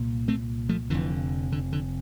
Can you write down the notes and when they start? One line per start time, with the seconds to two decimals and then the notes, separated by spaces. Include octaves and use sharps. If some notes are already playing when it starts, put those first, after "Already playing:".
Already playing: C2 A#2
0.28 A3 C4
0.69 F3 A3
0.90 F1 F2 D3 E3
1.52 D3
1.73 D3